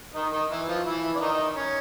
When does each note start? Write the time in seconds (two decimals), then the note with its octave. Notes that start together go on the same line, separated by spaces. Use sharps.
0.14 D#3 D#4
0.32 D#3 D#4
0.50 E3 E4
0.68 F3 F4
0.86 E3 E4
1.16 D4
1.20 D#3 D#4
1.56 C#4